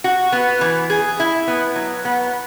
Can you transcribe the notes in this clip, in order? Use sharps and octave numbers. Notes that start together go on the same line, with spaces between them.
F#4
B3
E3
G#4
E4
B3
F#3
B3